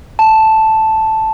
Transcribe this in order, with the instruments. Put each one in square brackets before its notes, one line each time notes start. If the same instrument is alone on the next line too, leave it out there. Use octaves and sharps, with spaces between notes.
[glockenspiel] A5